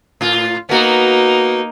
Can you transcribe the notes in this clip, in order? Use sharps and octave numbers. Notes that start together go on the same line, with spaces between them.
A2 F4
A#3 B3 D#4 F#4